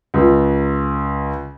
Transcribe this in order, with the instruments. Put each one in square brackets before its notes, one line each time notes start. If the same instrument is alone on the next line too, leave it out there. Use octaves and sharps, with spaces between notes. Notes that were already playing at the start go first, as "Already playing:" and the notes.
[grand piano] C#2